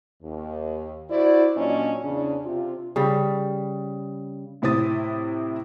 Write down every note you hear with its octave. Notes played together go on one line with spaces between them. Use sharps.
D#2
E4 F#4 C5 D5
A#2 F#3 A#3 C#4 D4 D#5
E2 C#3 D4
C3 F4
C#3 G3
A2 C3 E4 C5 D#6 A6